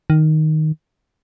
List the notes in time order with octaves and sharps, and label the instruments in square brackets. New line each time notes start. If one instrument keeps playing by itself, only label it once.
[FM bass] D#3